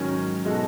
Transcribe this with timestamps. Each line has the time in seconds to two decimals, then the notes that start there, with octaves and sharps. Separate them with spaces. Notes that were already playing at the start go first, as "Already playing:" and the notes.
Already playing: G#2 D#3 F#3 C#4
0.45 B2 G#3 D#4 F#4 A4